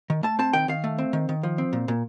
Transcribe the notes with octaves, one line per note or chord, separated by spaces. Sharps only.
D#3
A3 A5
C4 A5
D#3 G5
D#3 F5
A3
C4
D#3
D#3
F3
C4
A#2
A#2